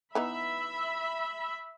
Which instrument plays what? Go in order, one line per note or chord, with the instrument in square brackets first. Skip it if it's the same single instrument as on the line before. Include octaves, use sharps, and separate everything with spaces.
[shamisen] E3 B3 D#4 [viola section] E5 B5